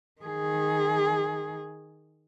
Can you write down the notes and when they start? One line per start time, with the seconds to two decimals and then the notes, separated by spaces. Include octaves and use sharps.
0.21 D#3 G#4